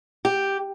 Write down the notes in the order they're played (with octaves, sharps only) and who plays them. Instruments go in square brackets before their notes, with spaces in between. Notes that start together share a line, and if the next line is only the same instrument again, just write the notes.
[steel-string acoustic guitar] G4